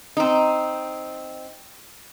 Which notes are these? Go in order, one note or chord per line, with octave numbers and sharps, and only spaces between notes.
C4 D#4